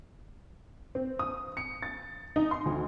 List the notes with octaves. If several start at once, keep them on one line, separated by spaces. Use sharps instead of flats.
C4
D#6
C#7
A6
D#4
C6
D2